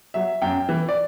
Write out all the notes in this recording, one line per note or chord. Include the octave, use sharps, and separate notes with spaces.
F#3 E5
F#2 G5
E3
D5